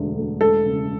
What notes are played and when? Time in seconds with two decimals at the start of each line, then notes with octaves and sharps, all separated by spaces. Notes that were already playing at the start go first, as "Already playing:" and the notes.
Already playing: E1 D2 D3
0.17 A3
0.41 E1 A4
0.64 C#3